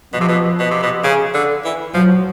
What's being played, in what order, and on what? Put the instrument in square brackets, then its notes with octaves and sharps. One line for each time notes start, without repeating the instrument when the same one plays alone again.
[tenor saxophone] B2 [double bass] F3
[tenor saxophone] C3
B2
B2
C3
B2
C#3
D3
E3
[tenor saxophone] F3 [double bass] F#3